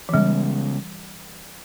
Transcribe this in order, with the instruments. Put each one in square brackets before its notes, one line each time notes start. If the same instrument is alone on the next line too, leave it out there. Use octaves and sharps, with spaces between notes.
[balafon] E3
[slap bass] C#3 G#3 B3 [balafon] G3